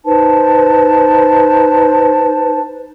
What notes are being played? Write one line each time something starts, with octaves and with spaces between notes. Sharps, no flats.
D#4 B4 C5 A5